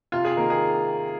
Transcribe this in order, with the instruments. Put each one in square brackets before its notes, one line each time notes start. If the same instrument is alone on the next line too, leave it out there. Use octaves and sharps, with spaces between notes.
[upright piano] C3 F4
G#4
D#3 A#3 A#4
G#4